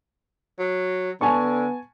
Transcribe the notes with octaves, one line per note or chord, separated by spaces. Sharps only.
F#3
D3 B3 G#5 A5 C#6